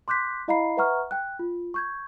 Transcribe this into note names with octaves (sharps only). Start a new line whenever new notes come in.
C6 D6 F#6 G6 B6
E4 D#5 F5 A#5 B5 C7
B4 E5 F#5 A#5 C#6 F6
G5 F#6
F4
C#6 G6 G#6